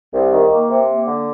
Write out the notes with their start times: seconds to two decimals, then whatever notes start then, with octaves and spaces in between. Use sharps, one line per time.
0.11 C2
0.30 D#3
0.49 A#3
0.68 C3
0.87 A#3
1.06 D3